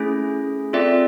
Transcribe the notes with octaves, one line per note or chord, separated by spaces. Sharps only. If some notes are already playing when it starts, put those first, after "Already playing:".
Already playing: A3 C#4 E4 G#4
C4 F4 A4 D5 E5